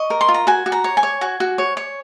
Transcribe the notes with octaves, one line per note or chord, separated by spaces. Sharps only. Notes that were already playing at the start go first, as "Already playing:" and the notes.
Already playing: D#5 C#6
A#4
C6
F4
A#5
F#4 G#5
F#4
A#5
C#5
G#5
C#5
F#4 G#5
F#4
C#5
C#5